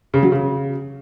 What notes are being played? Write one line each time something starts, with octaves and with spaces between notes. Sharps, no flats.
C#3
F#3
C#3